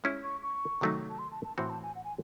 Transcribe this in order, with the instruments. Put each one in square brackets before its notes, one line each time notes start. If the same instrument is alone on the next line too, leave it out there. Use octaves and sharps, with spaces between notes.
[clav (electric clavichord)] G#3 C#4 E4
[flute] C#6
C#6
[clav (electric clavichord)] C3 D#3 F#3 A3 D#4
[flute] A5
C6
A5
A5
[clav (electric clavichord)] A2 E3 C4 F#4 [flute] C6
[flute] A5
G#5
F#5
G#5